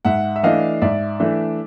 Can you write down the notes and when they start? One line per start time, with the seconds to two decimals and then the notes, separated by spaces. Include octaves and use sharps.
0.05 G#2 E5 F#5
0.36 E5
0.43 E3 A3 D4 D#5 F5
0.82 G#2 D5 E5
1.20 E3 A3 D4